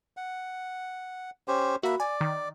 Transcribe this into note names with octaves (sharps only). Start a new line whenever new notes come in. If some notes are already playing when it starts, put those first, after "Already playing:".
F#5
C#4 G4 C5
A#3 F#4 E5 B5
D5 G#5
D#3